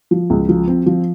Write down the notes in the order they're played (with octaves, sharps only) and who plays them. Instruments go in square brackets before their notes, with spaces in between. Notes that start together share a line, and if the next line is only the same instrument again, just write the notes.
[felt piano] F3
C#2
F3
C4
F3